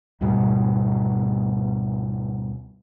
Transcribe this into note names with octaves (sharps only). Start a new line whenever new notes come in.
D2 G#2 B2 G3